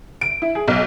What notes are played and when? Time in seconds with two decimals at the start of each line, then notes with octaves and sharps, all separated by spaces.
0.21 D7
0.42 E4
0.55 G#4
0.68 B1